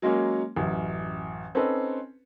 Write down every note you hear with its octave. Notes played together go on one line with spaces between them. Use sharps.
F#3 G#3 A#3 C#4
A1 F#2
C4 C#4 D#4 A4 B4